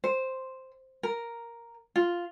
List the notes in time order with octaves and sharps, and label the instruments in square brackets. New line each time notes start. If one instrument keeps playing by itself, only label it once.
[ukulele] C5
A#4
F4